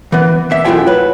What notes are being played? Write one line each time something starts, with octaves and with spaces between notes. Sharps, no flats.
E3 B3
E2 E5
F#2 A3 E4 F4 G5 G#5
F#3 B4